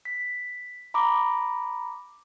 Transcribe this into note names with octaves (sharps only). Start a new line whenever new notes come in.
B6
A#5 B5 D6